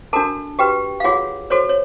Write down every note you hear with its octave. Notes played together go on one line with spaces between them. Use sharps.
D4 F#4 A4 A#4 A5
F#4 G4 B4 G5
F5
F4 F#4 G#4 C#5 F#5
F#4 A4 C5 C#5
C#5